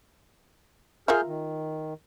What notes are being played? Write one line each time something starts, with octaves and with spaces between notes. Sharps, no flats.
F4 G#4 A#4 E5 F6 G6
D#3